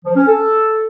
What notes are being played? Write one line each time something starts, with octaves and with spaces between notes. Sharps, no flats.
F3
C#4
A4